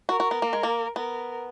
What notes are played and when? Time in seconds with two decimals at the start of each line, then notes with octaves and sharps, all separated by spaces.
0.09 F#4 A#4
0.20 F#4
0.31 B3
0.42 A#3
0.53 G#3
0.63 A#3
0.96 B3 A#4